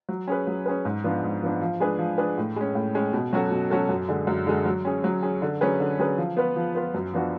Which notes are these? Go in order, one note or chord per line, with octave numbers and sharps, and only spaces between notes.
F#3
C#4 G#4 B4
F#3
C#4 G#4 B4
G#2
F3 B3 D4
G#2
F3 B3 D4
F3
G#3 D4 G#4 B4
F3
G#3 D4 G#4 B4
A2
G#3 C#4
A2
G#3 C#4
B2
F#3 C#4 F#4 A4
B2
F#3 C#4 F#4 A4
F#2
D3 G#3
F#2
D3 G#3
F#3
C#4 G#4
F#3
C#4 G#4
D3
F#3 C#4 G#4 B4
D3
F#3 C#4 G#4 B4
F3
B3 F4 B4
F3
B3 F4 B4
F#2
F3 B3 D4 F#4